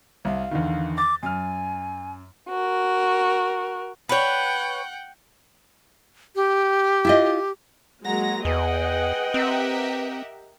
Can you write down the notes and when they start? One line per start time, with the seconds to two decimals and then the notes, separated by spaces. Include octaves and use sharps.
0.25 C2 F5
0.51 E2 D3 D#3
0.98 D6 A6
1.23 F#2 G#5 F6
2.49 F#4 A#4
4.09 B4 C#5 F#5 G5
6.35 G4
7.05 E4 F4 D#5
8.04 F#3 G#3 A#3 F#5 A#5 A#6
8.45 E2 G#4 B4 D#5 F#5 G5
9.34 C4 G4 A#4 E5